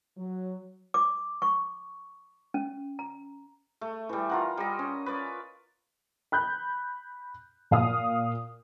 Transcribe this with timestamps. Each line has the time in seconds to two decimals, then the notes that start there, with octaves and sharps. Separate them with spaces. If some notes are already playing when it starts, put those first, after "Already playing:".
0.17 F#3
0.94 D6
1.42 C#6
2.54 C#4
2.99 A#5
3.81 A3
4.09 E3 G3
4.29 F4 A#4 F#5
4.57 G3 D#5
4.79 C#4
5.06 B4 C#5 D5 F5
6.32 B5 F#6 G6
7.71 A#2 F5 D#6